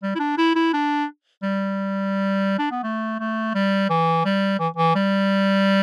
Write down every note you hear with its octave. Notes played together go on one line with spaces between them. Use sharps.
G3
E4
D4
E4
E4
D4
G3
D4
B3
A3
A3
G3
E3
G3
E3
E3
G3